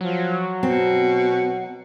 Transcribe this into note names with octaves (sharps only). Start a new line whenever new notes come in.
F3 F#3
B2 C4